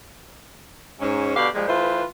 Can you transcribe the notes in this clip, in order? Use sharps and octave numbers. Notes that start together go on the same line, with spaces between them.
G#2 C#4
B2 D3 G4 D5 F5
A#2 F3 G3 G#3
E3 A3 F4 B4 C5